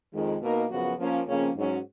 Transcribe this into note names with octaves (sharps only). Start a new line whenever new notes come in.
F2 D#3 G#3
B2 A#3 D#4 A#4
F#2 C#3 F3 B3 F#4
F3 A#3 C#4
F2 C#3 F3 A#3 C#4
G#2 F#3 C#4